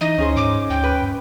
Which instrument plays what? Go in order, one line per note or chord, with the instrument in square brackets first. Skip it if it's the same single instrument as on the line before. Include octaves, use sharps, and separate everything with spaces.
[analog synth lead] E3 [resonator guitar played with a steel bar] D#4 [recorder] D#5
[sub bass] D2 [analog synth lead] C#4 [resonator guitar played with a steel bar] D#4 G#4 C5
[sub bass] G#2 [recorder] D6
[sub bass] D2 [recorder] G5
[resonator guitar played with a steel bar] B4
[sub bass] G2